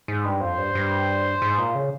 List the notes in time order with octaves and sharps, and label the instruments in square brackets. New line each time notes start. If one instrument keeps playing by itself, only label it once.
[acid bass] G#2
G2
[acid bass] F2 [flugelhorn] C5
[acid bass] G2
G2
G#2
A#2
C#3